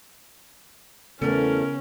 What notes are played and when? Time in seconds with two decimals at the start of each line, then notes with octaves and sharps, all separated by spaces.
1.22 E2 C#3 A3 B3 C#4 A#4